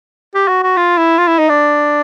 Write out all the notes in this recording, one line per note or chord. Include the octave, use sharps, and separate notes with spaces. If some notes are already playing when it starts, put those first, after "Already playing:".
G4
F#4
F#4
F4
E4
F4
E4
D#4
D4